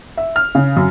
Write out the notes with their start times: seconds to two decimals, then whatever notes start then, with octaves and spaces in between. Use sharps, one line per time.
0.17 E5
0.36 F6
0.55 C#3
0.77 F#2